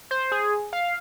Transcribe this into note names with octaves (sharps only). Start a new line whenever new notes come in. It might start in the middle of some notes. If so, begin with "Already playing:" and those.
C5
G#4
F5